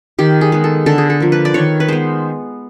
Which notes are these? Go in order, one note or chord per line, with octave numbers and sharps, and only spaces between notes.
D#3 G4
G#4
G#3 B3
A4
D3 A4
G#4
A4
F3 A#3
B4
D5
D#3 C#5
B4
G#3 B3 C5